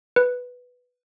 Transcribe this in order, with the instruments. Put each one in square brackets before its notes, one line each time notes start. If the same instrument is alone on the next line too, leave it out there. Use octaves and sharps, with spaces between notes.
[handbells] B4